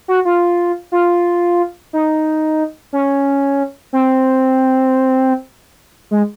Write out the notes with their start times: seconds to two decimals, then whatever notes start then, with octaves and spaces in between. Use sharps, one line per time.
0.08 F#4
0.25 F4
0.92 F4
1.93 D#4
2.93 C#4
3.93 C4
6.11 G#3